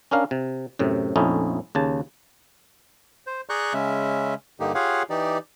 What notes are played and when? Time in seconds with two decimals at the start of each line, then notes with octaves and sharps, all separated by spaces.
0.11 C#4 D4 A#4 F5
0.31 C3
0.79 F#2 A2 C3
1.16 A#1 F2 A3 C#4 D#4 E4
1.75 D#2 C#3 A5
3.27 C5
3.49 G#4 D5 A#5 C#6 F#6 G6
3.74 C#3 G#3 C#4 E5
4.60 G2 D3 A#3 D#4 G4
4.75 F4 G4 G#4 C#5 F5 F#5
5.10 E3 D#4 G4 D5